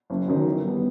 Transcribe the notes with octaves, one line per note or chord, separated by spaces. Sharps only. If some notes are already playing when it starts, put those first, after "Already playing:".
F#1
F#2 D#3
E3
G3 B3